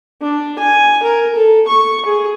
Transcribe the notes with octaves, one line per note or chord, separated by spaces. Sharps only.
D4
G#5
A#4
A4
C#6
G#4